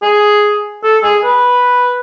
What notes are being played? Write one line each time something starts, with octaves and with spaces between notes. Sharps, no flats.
G#4
A4
G#4
B4